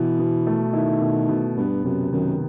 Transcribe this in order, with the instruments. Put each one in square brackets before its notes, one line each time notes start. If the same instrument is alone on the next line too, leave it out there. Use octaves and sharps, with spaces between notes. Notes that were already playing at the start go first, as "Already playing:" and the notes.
Already playing: [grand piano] B2 [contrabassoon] E3
[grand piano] B2
A3
[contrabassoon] D#3 [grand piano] E4
[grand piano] B2
B2
[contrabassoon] G2 [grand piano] B3
[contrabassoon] F#2 [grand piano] C3
[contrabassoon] F#2 [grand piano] D#3